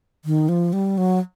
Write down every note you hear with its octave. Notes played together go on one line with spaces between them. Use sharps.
D#3
F3
G3
F#3